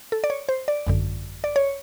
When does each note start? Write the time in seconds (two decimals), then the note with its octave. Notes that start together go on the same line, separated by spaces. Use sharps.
0.12 A4
0.24 D5
0.30 C#5
0.49 C5
0.68 D5
0.87 G#1 F#2 D3
1.44 D5
1.56 C#5